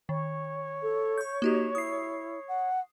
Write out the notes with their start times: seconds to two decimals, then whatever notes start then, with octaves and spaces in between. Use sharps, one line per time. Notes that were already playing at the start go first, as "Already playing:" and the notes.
0.09 D#3 C#5
0.82 A4
1.18 C#6 G6
1.42 A#3 D#4 F#4 G4
1.75 E4 D#6 C7
2.48 F#5